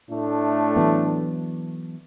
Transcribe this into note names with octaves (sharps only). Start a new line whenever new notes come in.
A2 A3 D4
E3 F#3 B3